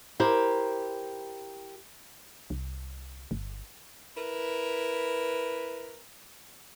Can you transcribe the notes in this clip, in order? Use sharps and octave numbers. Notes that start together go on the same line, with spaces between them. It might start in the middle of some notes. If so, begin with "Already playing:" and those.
E4 G4 A#4 C5
C2
G1
E4 A#4 B4